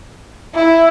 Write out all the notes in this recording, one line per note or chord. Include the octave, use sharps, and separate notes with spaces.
E4